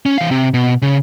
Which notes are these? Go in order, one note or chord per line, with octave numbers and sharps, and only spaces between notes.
C#4
E3 F5
C3
B2
C#3